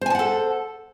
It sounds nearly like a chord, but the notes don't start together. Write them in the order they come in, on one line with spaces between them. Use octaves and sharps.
C5 G#5 A5 F#5 A4